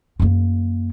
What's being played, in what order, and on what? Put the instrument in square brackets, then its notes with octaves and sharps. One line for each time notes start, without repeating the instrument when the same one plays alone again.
[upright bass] F#2 A#3